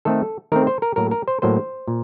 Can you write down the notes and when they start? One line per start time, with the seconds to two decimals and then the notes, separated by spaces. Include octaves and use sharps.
0.05 D#3 A3 C4 A4
0.52 D#3 A3 C4 A#4
0.67 C5
0.82 A#4
0.96 A2 F#3 A#3 A#4
1.11 A#4
1.28 C5
1.42 A2 F#3 A#3 C5
1.88 A#2